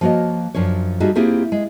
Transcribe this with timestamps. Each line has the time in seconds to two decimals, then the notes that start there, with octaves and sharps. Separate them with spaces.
0.01 F3 A#3 F#4 C#5 D#5
0.54 F#2 F3 D4 C#5
1.00 G3 A3 D#4 F4 F#4 G#4
1.15 A#3 C4 E4 F4 G4 G#4
1.52 G#3